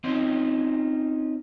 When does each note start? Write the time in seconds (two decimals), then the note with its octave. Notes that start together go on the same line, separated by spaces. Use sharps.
0.04 C4 C#4 D#4 F4 C5